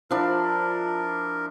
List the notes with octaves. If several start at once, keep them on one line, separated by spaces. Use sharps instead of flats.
F3 D4 E4 F4 A#4